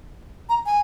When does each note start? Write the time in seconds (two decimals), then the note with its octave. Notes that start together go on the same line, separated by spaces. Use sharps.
0.49 A#5
0.66 G#5